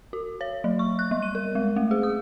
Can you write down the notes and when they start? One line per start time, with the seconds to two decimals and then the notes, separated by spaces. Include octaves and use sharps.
0.13 F#4
0.41 C#5
0.64 F#3
0.79 C#6
0.99 F#6
1.11 G3
1.22 D#7
1.35 A#4
1.55 G#3
1.76 A3
1.91 G#4
2.03 D#6